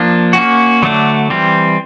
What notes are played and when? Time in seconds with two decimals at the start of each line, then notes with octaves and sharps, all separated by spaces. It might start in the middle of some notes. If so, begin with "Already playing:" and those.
Already playing: F3 A#3 D4
0.33 A#3 C#4 F#4
0.82 D3 F#3 A3 D4
1.30 E3 G3 C4